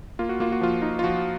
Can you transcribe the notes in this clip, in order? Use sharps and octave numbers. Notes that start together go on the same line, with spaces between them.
A#3 F4
F#4
A#3 F4
F#4
F3 F4
D#4
F4
F3 F#4